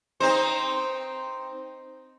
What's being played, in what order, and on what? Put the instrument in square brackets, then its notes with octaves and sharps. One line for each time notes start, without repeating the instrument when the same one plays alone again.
[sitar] C4 D#4 C5